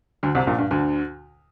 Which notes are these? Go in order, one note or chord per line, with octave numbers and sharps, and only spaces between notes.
D2 D3
C2 C3
A#1 A#2
G2
D2 D3